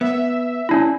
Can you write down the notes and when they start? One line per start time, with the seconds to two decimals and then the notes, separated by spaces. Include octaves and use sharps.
0.01 B3 E5
0.69 C#4 D4 E4